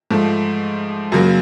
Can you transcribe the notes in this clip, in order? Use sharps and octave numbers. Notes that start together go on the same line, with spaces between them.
G#2 F3 A3
F#2 C#3 F#3 A#3